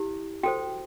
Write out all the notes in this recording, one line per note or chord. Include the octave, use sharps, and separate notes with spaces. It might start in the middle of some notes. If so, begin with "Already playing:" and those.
Already playing: E4 G4
F#4 A4 C5 G5